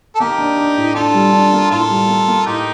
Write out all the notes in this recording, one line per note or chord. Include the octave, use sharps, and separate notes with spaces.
A4
A#3 D#4 G4
D4
D4
A2
D4 F4 A4
G3
D4
A#3
A2 F4 A4
G3
A#3
A#3
A2 D#4 G4